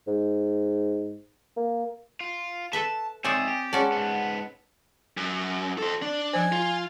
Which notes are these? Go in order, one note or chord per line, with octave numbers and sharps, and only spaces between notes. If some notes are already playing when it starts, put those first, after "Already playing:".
G#2
A#3
F4
A4 B4 E5 A5
G#2 C4 C#5 D5 E5 G#5 D#6 A6
G4
G#3 C#4 D5 F#5 A5
G#2 B3
F#2
A4 C5
D4
F3 C5 G#5
F4